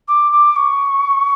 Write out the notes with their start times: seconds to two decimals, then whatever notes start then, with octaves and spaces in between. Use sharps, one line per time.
0.08 D6
0.32 D6
0.56 C#6